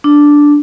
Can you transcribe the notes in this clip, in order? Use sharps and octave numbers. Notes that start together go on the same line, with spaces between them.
D4